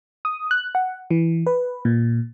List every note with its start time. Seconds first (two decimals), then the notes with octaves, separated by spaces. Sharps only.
0.25 D#6
0.51 F#6
0.75 F#5
1.11 E3
1.47 B4
1.85 A#2